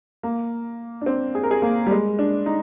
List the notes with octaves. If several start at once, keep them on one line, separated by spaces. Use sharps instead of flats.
A#3
D4
C4
G#4
A#4
G#4
A#3
G3
G#3
D4
D#4